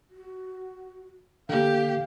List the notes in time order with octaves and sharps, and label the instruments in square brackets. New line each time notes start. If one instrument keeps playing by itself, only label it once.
[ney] F#4
[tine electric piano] D3 A#3 [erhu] G4 [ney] F5